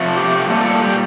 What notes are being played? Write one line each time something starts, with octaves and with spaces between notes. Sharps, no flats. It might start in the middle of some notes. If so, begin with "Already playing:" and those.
Already playing: C3 F3 A3
G4
A#2 G3 A4
A4
G4